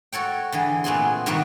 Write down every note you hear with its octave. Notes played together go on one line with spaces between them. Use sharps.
F#4 A4 C#5 G5
D3 E3 G#4
A#2 A3 B3 C4 G#4 C6
G#2 C3 D#3 G3 A3 F#4